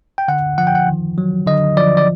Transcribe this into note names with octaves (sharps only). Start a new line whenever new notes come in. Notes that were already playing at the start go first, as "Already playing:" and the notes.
G5
D3 F#5
F3 F#5
G5
F#5
D#3
F#3
D3 D#5
F3 D5
D5